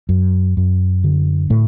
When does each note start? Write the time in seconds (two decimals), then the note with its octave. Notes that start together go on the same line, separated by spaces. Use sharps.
0.09 F#2
0.57 F#2
1.04 D3
1.50 A2 A3